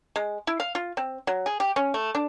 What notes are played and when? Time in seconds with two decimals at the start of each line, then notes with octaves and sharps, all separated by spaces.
0.16 G#3
0.47 E4
0.60 F5
0.75 F4
0.97 C4
1.27 F#3
1.46 G#4
1.60 G4
1.76 C#4
1.94 A3
2.15 D4